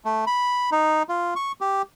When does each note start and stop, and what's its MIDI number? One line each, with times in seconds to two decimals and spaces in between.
0.05 0.25 57
0.27 0.70 83
0.72 1.03 63
1.09 1.34 65
1.36 1.52 85
1.61 1.82 67